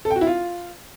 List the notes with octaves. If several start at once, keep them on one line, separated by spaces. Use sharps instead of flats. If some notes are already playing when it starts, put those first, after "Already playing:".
A4
G5
F#4
E4
F4